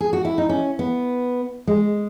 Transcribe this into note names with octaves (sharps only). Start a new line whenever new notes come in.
G#4
F#4
E4
D#4
C#4
B3
G#3